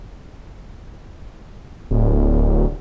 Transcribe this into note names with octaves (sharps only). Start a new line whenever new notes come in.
D1